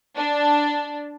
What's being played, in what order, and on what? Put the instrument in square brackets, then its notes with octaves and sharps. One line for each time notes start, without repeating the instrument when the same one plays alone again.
[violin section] D4